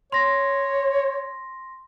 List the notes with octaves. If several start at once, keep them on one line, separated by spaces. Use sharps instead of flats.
C#5 C6 A#6